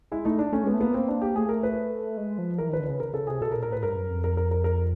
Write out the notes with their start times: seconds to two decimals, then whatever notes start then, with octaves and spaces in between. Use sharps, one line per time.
0.12 G#3 E4
0.25 A3 D#4
0.39 D4
0.53 A3 C#4
0.63 G#3 B3
0.74 A3
0.81 A#3 B3
0.94 C4
1.08 D4
1.22 G4
1.35 A3 G#4
1.49 A#4
1.63 B4
2.17 G#3
2.38 F3
2.58 E3 A#4
2.69 D#3 B4
2.80 D3
2.86 C#3 B4
3.00 A#4
3.14 C#3 A4
3.27 C3 G#4
3.42 B2 A4
3.52 A#4
3.55 A#2
3.63 A#4
3.69 A2 B4
3.83 G2 A#4
3.96 F#2
4.10 F2
4.24 A#4
4.37 A#4
4.51 A#4
4.64 A#4